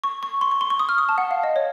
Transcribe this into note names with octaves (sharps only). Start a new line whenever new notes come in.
C#6
C#6
C6
C#6
C6
C#6
D#6
F6
D#6
A5
F#5
F5
D#5
C#5